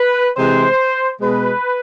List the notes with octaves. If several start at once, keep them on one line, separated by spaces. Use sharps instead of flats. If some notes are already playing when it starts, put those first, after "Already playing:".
Already playing: B4
C3 E3 G#3 C5
B2 G#3 B4